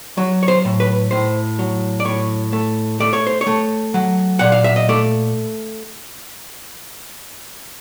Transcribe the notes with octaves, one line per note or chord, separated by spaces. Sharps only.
F#3
C#5
C5
A2
B4
A2 C5
F#3
D5
A2 C#5
A3
A3 D5
C#5
C5
C#5
A3
F#3
A#2 F#5
F5
E5
D#5
A3 D5